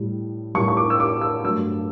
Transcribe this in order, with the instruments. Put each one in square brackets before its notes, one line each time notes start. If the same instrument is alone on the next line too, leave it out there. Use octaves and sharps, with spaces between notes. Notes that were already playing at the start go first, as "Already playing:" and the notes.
Already playing: [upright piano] A2 G3
A2 G3 C#6
C#6
D6
E6
D6
E6
G2 F#3 A3 E6